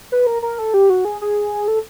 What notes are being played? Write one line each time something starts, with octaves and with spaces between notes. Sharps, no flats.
B4
A#4
A#4
A4
G4
F#4
G#4
G#4
A4